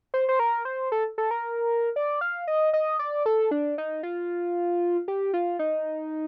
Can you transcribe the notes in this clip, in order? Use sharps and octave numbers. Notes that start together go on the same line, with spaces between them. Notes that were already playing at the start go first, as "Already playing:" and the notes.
C5
C5
A#4
C5
A4
A4
A#4
D5
F5
D#5
D#5
D5
A4
D4
D#4
F4
G4
F4
D#4